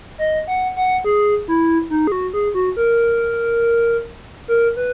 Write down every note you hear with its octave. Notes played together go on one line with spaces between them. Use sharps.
D#5
F#5
F#5
G#4
E4
D#4
G#4
F#4
G#4
F#4
A#4
A#4
B4